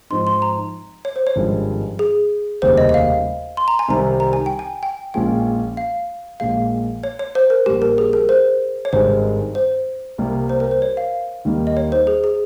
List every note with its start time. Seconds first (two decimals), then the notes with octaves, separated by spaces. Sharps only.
0.10 G#2 F3 C4 D#4 C6
0.27 C6
0.42 A#5
1.05 C#5
1.16 C5
1.27 C#5
1.36 G#1 G2 F3 G#3 C#4
1.99 G#4
2.62 F1 D#2 C#3 G3 C5
2.78 D#5
2.89 D#5
2.94 F5
3.57 C6
3.68 A#5
3.79 G#5
3.88 C2 C3 D#3 G3 C4 A#5
4.20 A#5
4.33 G#5
4.46 G5
4.59 G#5
4.83 G5
5.14 A#1 A#2 G#3 C#4 F4 G5
5.77 F5
6.40 A#1 A#2 G#3 F5
7.03 C#5
7.19 C#5
7.35 C5
7.50 A#4
7.66 A#1 A#2 G3 G4
7.82 A#4
7.98 G#4
8.13 A#4
8.29 C5
8.85 C#5
8.93 G#1 G2 D#3 G#3 C5
9.55 C5
10.18 C2 C3 G3 A#3
10.49 C5
10.60 A#4
10.71 C5
10.82 C#5
10.97 F5
11.45 D#2 D#3 G3 A#3
11.67 D#5
11.77 C#5
11.92 C5
12.07 G#4
12.24 G#4